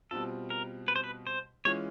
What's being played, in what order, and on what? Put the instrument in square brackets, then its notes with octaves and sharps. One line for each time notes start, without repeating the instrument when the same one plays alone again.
[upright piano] B2 G3 C4 F4 [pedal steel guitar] A4
[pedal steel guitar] A#4
B4
C5
B4
C5
[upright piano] E3 G#3 C#4 F4 [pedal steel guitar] C#5